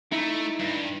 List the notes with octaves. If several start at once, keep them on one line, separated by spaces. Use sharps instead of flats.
A3 D#4 E4
G2